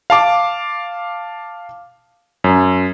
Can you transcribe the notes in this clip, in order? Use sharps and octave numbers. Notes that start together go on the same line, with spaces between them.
F5 A5 D6
F#2